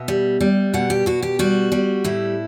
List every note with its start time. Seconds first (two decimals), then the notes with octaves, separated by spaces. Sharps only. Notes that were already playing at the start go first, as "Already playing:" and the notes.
Already playing: B2 E5
0.08 G3
0.41 G3
0.74 B2 F#5
0.90 G4
1.06 B2 F#4
1.22 G4
1.39 G3 F#4
1.72 G3
2.04 A2 E4